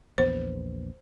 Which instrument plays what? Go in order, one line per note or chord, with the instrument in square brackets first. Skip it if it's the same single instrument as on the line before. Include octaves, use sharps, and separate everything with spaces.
[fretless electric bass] A#1 E2 B3 [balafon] C5